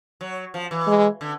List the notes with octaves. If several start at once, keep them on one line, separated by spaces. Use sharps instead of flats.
F#3
F3
E3
G#3
D3